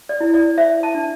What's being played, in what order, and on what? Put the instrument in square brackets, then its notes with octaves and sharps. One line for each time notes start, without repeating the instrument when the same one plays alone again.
[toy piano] D5
E4
D5
C5 E5
A5
D4